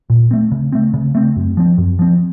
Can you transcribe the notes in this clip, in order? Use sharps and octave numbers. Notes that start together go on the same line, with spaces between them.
A#2
A3 C4
C#3
A3 C4
C#3
A3 C4
F#2
F3 C4
F#2
F3 C4